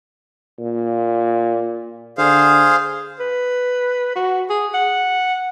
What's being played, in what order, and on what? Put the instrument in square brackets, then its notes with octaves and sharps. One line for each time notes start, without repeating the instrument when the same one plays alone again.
[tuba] A#2
[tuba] D3 [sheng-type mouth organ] G#4 C5 F5
[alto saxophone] B4
F#4
G#4
F#5